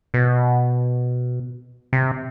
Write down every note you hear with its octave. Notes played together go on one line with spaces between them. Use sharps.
B2
C3